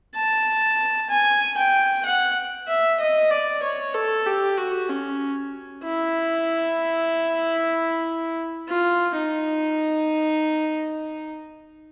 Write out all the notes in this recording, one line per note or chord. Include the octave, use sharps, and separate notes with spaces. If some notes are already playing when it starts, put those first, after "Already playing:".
A5
G#5
G5
F#5
E5
D#5
D5
C#5
A4
G4
F#4
C#4
E4
F4
D#4